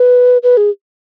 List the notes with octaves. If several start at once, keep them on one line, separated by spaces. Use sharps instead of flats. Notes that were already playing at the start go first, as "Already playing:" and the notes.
Already playing: B4
B4
G#4